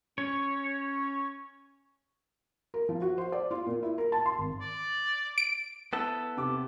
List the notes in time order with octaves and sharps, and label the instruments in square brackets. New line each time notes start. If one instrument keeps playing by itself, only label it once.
[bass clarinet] C#4 [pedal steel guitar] C#5
[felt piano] A#4
F3
F#4
C5
D5
F4
A#2
E4
A#4
A5
C6
G#1
[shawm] D5
[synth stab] D7
[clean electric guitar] B3 E4 A4
[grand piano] C3 D6